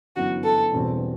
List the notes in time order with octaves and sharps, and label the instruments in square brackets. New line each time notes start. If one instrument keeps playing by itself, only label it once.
[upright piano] G1 F#2 E3 B3 E4 [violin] F#4
[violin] A4
[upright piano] E1 E2 B2 G3 C4